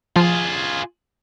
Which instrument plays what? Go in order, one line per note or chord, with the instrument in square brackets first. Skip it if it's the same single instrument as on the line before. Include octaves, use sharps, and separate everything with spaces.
[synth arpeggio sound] F3 [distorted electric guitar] F4 G#4